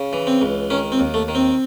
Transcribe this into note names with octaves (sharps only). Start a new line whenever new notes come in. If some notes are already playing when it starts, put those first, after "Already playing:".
Already playing: C#3
E3
C4
C#2
D#3 C#4
C4
D#2
A3
D#3
C4